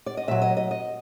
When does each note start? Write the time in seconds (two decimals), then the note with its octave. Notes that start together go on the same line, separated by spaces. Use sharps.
0.06 D5
0.17 D#5
0.28 A#2 F#3 E5
0.42 D#5
0.57 D#5
0.71 D#5